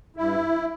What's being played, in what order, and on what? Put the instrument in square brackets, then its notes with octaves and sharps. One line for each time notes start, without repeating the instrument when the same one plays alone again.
[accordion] G2 E4